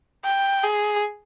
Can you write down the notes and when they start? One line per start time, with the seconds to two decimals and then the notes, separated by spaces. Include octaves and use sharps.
0.25 G5
0.64 G#4